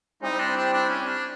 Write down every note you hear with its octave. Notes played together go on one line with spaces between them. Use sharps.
G3 C4 D#4 E4 G4 C5
D4
D4
D4
C#4
D4